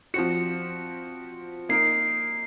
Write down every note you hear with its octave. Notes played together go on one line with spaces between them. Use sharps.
F3 C4 F#4 C#7
A#3 D#4 A#4 C7